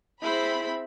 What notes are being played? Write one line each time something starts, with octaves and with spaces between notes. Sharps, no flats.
C4 E4 G#4 C5 B5